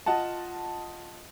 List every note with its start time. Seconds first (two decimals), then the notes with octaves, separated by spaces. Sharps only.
0.06 F4 D#5 F#5 A5